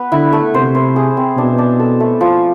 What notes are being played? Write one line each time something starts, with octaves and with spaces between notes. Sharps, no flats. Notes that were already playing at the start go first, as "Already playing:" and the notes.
Already playing: B3 B4
D3 E4
A3
C3 C5
C5
G#4
C4
B2 D4
D4
A4
A3
F3